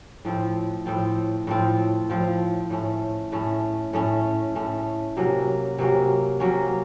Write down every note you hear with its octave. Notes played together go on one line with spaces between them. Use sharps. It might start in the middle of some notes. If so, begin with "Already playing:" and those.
A2 F3 C4 F4
A2 F3 C4 F4
A2 F3 C4 F4
A2 F3 C4 F4
A2 A3 C#4
A2 A3 C#4
A2 A3 C#4
A2 A3 C#4
C3 F#3 A#3 C#4
C3 F#3 A#3 C#4
C3 F#3 A#3 C#4